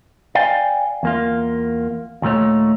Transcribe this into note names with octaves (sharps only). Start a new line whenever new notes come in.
D5 F5 G5 G#5
E2 A#3 F4
D#2 A#2 E3 A3 C#5